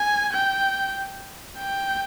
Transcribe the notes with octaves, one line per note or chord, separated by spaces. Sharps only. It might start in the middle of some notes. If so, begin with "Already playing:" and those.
Already playing: G#5
G5
G5